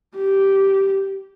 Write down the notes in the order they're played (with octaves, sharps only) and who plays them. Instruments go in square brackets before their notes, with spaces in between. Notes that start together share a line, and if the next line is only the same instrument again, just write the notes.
[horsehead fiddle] G4